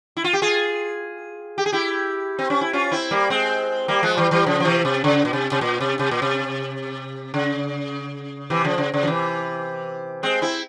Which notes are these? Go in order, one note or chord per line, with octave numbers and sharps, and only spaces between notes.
E4
F4
G4
F4 G#4
G4
G#4
E4 G4
C4
C#4
E4
C#4 F4
C4 E4
G3 A#3
G#3 C4
G3 A#3
F3 G#3
E3 G3
E3 G3
C#3 F3
F3
C3 E3
C3
C#3
A#2
C3
C3
A#2
C3
C3
A#2
C3
C#3
C3 E3
C#3 F3
C#3
C#3
F3
C3 E3
G#3 C4
C4 E4